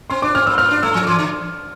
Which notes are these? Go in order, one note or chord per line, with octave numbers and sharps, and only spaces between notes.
C4 C6
D4 D6
C4 F6
A#3 E6
A#3 F6
D4
A3 E6
F3
E3 D6
D3